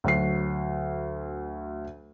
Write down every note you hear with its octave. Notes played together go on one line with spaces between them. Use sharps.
D2 F#3 F#4 C7